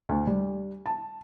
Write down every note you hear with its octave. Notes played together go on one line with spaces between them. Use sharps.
D2
G3
A5